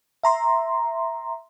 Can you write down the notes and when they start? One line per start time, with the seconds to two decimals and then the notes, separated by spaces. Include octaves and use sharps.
0.23 E5 A#5 C6